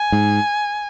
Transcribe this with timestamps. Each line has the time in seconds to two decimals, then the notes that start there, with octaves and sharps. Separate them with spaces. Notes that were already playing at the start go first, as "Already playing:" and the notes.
Already playing: G#5
0.12 G#2